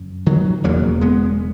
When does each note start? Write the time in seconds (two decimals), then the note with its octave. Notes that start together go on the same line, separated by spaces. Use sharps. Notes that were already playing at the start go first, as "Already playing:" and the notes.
Already playing: F#1 F#2
0.26 D#3 F#3
0.63 E1 E2 C#3 F#3 A#3
1.01 G#3 B3